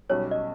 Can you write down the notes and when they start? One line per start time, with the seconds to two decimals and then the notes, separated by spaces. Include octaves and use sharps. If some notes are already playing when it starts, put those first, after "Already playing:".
0.09 B1 B2 G3 C#4 C#5
0.31 D#5